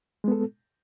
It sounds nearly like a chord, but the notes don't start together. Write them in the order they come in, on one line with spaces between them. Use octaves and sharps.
G#3 B3 A4